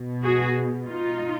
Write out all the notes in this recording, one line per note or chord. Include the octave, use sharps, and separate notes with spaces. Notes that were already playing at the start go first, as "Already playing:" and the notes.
Already playing: B2
F#4 G#4
D#4 F4